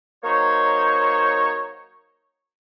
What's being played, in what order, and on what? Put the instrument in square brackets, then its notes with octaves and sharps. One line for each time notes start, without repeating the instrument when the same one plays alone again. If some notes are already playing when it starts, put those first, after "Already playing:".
[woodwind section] F#3 A#3 D#4 C5 C#5